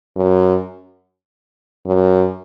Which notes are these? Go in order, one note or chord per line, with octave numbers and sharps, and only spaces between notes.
F#2
F#2